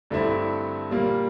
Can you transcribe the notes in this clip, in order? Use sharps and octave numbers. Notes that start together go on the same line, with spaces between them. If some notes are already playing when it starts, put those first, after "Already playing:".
G2 D3 A3 C4 E4
A#2 G3 A#3